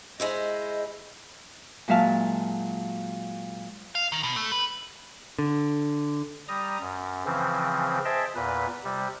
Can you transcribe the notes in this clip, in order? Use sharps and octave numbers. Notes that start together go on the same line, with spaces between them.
G#3 E4 C5 D#5
A#2 F#3 G#3 E5 F5 A5
F5
D#3
B2
A3
B4
D3
G3 A#5 D#6
F#2
C#3 E3 F3 C4
G#4 C5 D#5 E5 G5 A5
E2 A#2 B4
C3 G3